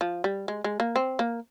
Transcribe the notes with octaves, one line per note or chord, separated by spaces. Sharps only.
F3
G3
G#3
G#3
A#3
C4
A#3